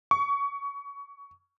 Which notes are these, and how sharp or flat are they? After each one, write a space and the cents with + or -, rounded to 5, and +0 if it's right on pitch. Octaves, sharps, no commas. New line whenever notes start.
C#6 +20